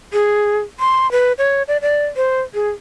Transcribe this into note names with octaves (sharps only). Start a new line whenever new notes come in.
G#4
C6
B4
C#5
D5
D5
C5
G#4